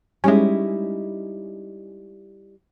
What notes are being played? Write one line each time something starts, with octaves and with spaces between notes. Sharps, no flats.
G3 G#3 C#4 D#4 E4